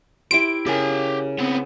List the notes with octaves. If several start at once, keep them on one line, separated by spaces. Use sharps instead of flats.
E4 G4 C5 D7
C#3 G4 A#4 G#5
B3 C4